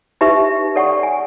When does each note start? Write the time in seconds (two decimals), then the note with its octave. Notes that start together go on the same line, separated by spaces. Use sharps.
0.21 D#4 G4 B4 E5
0.76 A4 D5 F#5 G5 C#6
1.03 G#5